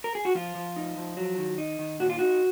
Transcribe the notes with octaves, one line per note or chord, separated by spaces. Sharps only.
A#4
G#4
F#4
F3 F4
F3
D#4
F3
F#3
D#3
D#4
D#3
A#2 F#4
F4
D#4 F#4